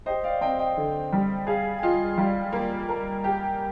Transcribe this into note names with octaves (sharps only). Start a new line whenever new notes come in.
G4 C5 D#5
D5 F5
C4 D#5 G5
D#5 G5
D3
G3
G#4 F5 G#5
G#5
F4 D#5 G5
G3 D5 F5
A#3
A#4
G4